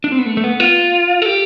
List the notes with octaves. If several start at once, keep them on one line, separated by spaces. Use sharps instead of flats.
D4
C4
B3
A3
A3
B3
F4
A4
G4